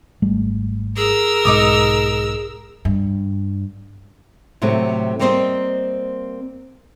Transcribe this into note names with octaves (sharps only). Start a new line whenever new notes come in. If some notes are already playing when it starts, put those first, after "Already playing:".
G#1 G3 A3
G#4 A#4 E6
B1 G#2 D#4 D6 D#6
G2
A2 C3 F#3 A3
G3 A#3 C4 C5 C#5 D#5